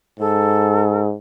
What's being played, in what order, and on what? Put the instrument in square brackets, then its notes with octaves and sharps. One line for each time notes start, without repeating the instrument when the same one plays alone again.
[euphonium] G#2 [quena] A4